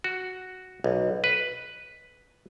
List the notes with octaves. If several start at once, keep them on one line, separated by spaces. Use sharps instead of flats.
F#4
B1
B4